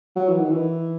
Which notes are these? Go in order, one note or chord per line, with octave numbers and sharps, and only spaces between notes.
F#3
E3
D#3
E3